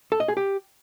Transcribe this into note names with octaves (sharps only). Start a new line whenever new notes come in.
A4
D#5
G#4
G4